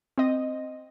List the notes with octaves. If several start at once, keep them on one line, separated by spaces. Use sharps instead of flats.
C4 D#5